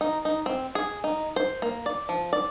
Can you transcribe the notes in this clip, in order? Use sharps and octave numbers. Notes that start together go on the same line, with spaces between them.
D#4
D#4
C4
G#4
D#4
C5
A#3
D5
F3
D5